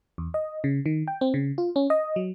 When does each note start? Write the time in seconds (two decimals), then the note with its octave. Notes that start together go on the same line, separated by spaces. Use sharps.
0.18 E2
0.34 D#5
0.64 C#3
0.86 D#3
1.08 G5
1.21 C4
1.34 C#3
1.58 F4
1.76 C#4
1.90 D#5
2.16 F#3